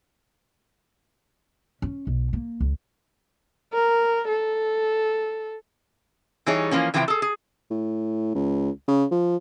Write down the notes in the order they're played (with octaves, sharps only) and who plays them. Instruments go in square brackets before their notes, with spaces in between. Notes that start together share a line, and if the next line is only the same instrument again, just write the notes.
[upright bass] C#4
B1
A#3
C#2
[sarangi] A#4
A4
[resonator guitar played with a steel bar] E3 G3 D#4 G#4 C#5
E3 F3 A#3 C#4
C3 E3 F3 E4 G4 G5
G#4 A4
G#4
[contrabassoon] A2
C#2
C#3
F3